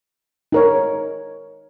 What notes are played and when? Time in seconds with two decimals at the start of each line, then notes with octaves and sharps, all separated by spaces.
0.52 D#4 A#4 C#5